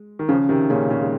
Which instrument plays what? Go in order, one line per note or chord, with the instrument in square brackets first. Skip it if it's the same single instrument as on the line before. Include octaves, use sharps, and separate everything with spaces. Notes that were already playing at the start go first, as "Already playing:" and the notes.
Already playing: [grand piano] G#3
D#3
[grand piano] C#3 F3 [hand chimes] C#4
[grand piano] C3 D#3
[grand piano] A#2 C#3 [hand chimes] G#4 C#5 F5
[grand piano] A#2 C#3
G#3